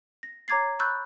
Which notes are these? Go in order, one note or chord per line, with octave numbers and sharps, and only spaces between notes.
A#6
C#5 A#5 D6 G#6 A6 C7
B5 C#6 E6 F#6 G6 A6